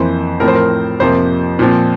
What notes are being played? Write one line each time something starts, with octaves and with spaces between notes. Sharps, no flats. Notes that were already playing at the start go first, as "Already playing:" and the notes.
Already playing: F2 E3 A#3 C5
A2 F3 C4 A#4
C5
A#4
F2 C3 F3 A#3 C5
A#2 F3 C4